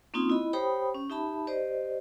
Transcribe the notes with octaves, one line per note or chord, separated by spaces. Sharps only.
A#3 C4 C#4 D#4 F4 D#6
E4 D#5 B5
G4 C5 C#5 G5 B5 D#6
C#4
D#4 G4 E5 A5 B5
G4 C5 D5 D#5